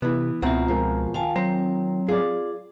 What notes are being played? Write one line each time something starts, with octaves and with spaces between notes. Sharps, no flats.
C3 E3 B3
C#2 B2 C4 E4 F4 F#5 A#5
F3 G#3 A#4
D#3 F4 F5 G#5 A5
F#3 C4 C5 A#5
F4 G#4 D5